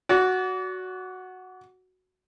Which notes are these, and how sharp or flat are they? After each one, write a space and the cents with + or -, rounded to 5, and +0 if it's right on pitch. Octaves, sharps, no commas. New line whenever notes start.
F#4 +0 D5 -40